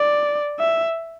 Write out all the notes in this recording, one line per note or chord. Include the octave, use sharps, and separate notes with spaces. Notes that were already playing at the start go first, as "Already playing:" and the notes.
Already playing: D5
E5